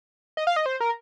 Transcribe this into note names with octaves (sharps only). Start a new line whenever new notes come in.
D#5
F5
D#5
C5
A#4